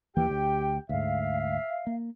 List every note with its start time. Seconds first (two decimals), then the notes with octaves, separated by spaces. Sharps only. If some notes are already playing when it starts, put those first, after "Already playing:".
0.17 D#2 E3 A#3 G4 G5
0.30 D2
0.89 D2 G#2 E5 F5
1.87 A#3